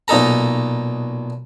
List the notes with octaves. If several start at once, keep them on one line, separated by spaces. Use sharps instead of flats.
B1 A#2 D#4 A4 A#5